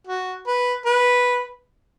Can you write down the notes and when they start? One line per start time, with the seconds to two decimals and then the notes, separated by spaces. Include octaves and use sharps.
0.07 F#4
0.47 B4
0.86 B4